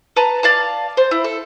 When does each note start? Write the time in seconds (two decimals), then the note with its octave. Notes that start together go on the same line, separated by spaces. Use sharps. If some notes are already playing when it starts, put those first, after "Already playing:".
0.16 B4 A5 A#5
0.43 D5 F5 A5
0.97 C5
1.11 E4
1.24 A4